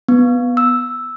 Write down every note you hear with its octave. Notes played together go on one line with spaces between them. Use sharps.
B3
E6